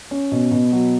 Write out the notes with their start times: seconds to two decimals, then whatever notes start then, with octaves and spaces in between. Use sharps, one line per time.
0.11 C#4
0.32 B2
0.51 B2
0.72 F#3